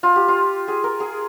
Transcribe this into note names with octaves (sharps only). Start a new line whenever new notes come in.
F4
G4
F4
G#4
A#4
G#4